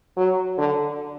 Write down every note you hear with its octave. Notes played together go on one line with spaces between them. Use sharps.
F#3
D3